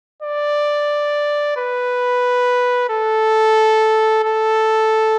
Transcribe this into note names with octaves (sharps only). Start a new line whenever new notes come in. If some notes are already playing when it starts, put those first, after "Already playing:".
D5
B4
A4
A4